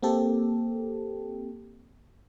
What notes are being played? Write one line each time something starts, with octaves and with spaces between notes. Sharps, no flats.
A#3 C4 G4 A4